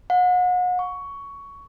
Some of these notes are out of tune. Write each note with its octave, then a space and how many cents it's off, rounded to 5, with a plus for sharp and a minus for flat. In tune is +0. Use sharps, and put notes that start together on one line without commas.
F#5 -35
C#6 +15